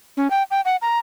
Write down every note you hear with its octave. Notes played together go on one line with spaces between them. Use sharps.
C#4
G5
G5
F#5
A#5